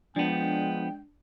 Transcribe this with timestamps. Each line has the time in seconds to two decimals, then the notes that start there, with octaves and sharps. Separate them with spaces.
0.16 F3 G#3 B3 D4 G5